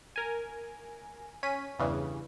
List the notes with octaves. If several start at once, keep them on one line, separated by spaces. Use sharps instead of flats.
A#4 G#5
C#4 B6 D#7
E2 G2 C#3 E3